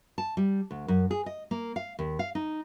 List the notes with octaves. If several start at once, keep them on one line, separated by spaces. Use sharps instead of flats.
A5
G3
D2
F#2
G#4
D#5
A#3
F5
D#2
F5
D#4